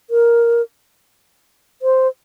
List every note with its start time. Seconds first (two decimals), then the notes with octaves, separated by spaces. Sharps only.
0.10 A#4
1.82 C5